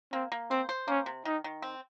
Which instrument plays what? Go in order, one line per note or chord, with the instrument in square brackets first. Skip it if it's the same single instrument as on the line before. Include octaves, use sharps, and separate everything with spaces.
[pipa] A#3 [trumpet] C4
[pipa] A#3
[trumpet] C4 [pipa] C5
[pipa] C5
[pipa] A#3 [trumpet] C#4
[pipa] C3
[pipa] D#3 [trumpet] D#4
[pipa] D#3
C4